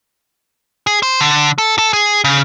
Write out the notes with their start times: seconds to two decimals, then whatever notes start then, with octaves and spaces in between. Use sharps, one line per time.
0.87 G#4
1.03 C5
1.21 D3
1.58 A4
1.78 A4
1.93 G#4
2.24 C#3